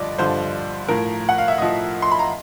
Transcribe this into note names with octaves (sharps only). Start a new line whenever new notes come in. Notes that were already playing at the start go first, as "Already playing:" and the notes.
Already playing: G2 D3 F3 D5 D#5
G2 D3 F3 C5
A2 F3 A#4
F#5
F5
E5
A2 F3 D#5
C6
B5
A#5